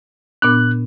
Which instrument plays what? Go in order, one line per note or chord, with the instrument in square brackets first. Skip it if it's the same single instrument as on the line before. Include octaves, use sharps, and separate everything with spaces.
[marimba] A#2 B3 D4 [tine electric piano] F#6